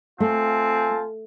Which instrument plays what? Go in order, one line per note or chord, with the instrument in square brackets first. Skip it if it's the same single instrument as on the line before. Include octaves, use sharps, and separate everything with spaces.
[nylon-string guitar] A3 [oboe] C4 [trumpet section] F4 G#5 A5